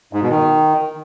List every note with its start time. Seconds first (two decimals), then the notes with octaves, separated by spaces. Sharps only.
0.13 G#2
0.21 B2
0.30 D#3